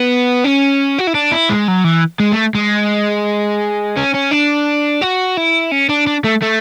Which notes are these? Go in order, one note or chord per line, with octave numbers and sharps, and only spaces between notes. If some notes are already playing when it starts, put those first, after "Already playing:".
Already playing: B3
C#4
F#4
E4
D4
E4
G#3
F#3
E3
G#3
A3
G#3
C#4
C#4
D4
F#4
E4
C#4
D4
D4
A3
A3